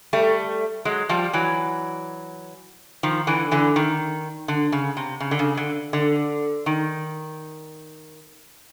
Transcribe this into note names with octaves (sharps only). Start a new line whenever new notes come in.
G3 A3
F#3 G#3
F3 G3
E3 F#3
D#3 F3
D3 E3
D3 E3
D#3
D3
C#3
C3
C#3
D3
C#3
D3
D3
D#3